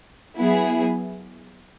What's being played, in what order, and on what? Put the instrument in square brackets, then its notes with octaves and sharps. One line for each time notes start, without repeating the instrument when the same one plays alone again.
[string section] F#3 B3 E4 G#4